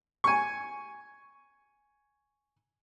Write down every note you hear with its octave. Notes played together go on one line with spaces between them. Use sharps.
G#5 C#6